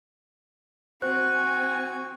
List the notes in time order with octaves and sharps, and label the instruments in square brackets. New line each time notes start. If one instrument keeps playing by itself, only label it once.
[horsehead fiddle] C4 G#5 [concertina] F#4 C#6 [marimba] C5 [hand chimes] F#6